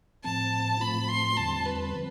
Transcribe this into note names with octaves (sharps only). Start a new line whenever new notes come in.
A2 F3 C4 A5
A2 F3 A3 C4 F4 B5
C6
E2 D3 G3 C4 A5
B4
F3 C4